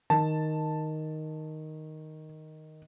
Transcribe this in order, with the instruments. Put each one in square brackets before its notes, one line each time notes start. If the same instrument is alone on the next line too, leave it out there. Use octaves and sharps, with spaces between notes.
[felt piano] D#3 [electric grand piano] A5